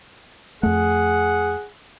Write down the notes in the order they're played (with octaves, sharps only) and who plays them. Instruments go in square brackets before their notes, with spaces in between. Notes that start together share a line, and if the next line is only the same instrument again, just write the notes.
[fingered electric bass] F2 A3 [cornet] G#4 [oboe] F#5